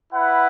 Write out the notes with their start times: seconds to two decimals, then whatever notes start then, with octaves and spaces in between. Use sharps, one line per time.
0.13 E4 B4 F#5